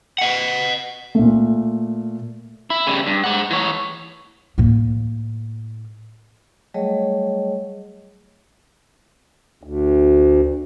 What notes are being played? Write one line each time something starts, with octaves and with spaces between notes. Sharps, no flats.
D#5 F#5
A#2 A3
E4
C#3 G3
G2
G#3 F#5
E3 C#5
A2 A#3
F#3 G3 A3 G#4 C#5 D#5
D2